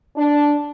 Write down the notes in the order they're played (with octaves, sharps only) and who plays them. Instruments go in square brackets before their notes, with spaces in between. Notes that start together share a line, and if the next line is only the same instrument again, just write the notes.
[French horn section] D4